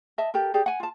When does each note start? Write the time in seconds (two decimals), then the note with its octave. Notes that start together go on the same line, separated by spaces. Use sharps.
0.18 D#5 E5 A5
0.34 G4 A4 A#4
0.54 G4 G#4 D5
0.66 F#5 G#5
0.80 F4 A5